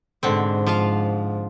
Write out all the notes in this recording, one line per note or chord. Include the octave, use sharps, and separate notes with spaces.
G#2 B2 D3 C4
F3 F4 F5